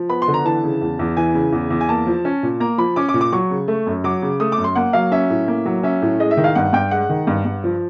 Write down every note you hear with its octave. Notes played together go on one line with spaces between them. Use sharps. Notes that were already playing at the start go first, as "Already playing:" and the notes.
Already playing: F3
B3 B5
C6
D3
A#5
E3 A5
C#3
E2
E2
E3 G#5
C#3
E2
E2
G#5
A#3 A5
F3
C#4
A#2
A#3 A#5
F3 B5
C#4 D6
D6
A#2
D6
F#3 C#6
C#3
A3
F#2
F#3 D6
C#3
A3 D#6
D6
F#2
C6
A#3 F#5
F#3 F5
C#4 E5
A2
A#3
F#3
C#4 E5
A2
G#3 D#5
E5
D#3
F5
G2 F#5
G2 G5
G#3 F#5
D#3
G2
G2
F3